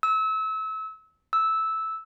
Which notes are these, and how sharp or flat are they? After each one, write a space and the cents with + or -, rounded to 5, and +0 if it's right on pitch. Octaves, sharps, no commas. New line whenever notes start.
E6 -30
E6 -10